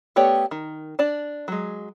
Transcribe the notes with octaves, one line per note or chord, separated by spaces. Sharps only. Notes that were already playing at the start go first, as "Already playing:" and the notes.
A3 B3 G4 C#5 D5
D#3
D4 D5 A5
F#3 G#3